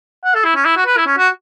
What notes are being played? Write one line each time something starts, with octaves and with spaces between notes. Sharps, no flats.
F#5
A4
E4
C#4
E4
F#4
B4
E4
C#4
F#4